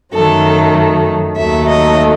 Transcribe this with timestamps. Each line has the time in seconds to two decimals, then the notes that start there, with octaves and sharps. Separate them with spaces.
0.14 F#2 D#3 F#3 A3 A4
1.38 D#2 D#3 F#3 A3 E5
1.69 D#5